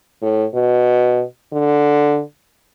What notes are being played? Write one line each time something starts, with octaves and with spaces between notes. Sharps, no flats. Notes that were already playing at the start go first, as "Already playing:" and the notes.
A2
B2
D3